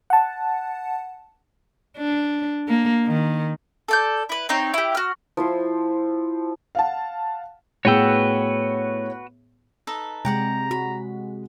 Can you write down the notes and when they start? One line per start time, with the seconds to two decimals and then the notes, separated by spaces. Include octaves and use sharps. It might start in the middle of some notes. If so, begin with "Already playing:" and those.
0.10 F#5 A5
1.97 D4
2.68 A#3
3.06 D#3
3.88 A4 D5 G6
4.29 E4 B4
4.49 C4 D#4 C#5
4.74 E4 G4
4.95 F#4 F6
5.37 F3 E4 C5
6.75 F5 F#5 A5
7.85 A2 B3 F#4 G#4 B4 C#5 G5 E6
9.87 D#4 A4 B4
10.25 C3 G#3 D5 F#5 G5 A#5
10.71 F#4 B5